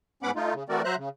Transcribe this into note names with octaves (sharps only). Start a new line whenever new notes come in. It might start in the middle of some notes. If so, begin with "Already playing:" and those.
G#2 B3 C#4 F#5 B5 D6
A3 D#4 F4
C#3
E3 A3 C4 F#4 A#4 D5
F#3 C5 E5 A#5 F#6
C#3